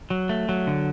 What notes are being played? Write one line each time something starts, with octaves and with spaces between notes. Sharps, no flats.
F#3
A3
F#3
D3